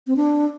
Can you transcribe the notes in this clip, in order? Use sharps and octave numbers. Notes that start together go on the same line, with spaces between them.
C4
D4